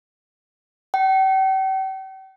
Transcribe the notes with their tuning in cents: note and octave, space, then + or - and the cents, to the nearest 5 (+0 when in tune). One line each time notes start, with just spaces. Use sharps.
G5 -40